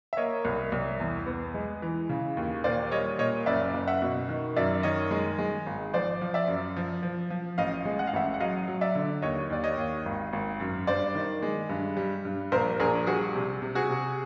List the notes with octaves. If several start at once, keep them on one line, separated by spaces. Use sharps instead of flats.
E5
A#3 C#5 D#5
C2
C2
E2
B3
G#3
E3
C#3
D#2
A#2 C5 D5
G3 C#5 D#5
A#2 C#5 D#5
F#1 D5 E5
F#1
E5 F#5
B2
D#3
F#2 D5 E5
D#3 C#5 D#5
G#3
G#3
G#1
F3 C5 D5
F3
D5 E5
F#2
F3
F3
F3
A1 D#5 F5
G#3
F#5
F5
A1 E5 F#5
F#5
F#3 D#5 F5
F#3
D5 E5
D3
D#2 C#5 D#5
D#2 D5
C#5 D#5
D#2
G#1
G#1
F#2
G2 C5 D5
D#3
G#3
G2
G3
G2
A#1 A#4 C5
A#1 G#4 A#4
G3 F#4 G#4
C3
C3
F#4 G#4
C3